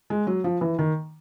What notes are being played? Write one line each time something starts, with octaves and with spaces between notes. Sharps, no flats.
G#3
F#3
F3
E3
D#3